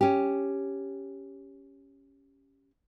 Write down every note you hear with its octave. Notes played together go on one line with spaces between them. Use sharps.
C#4 G4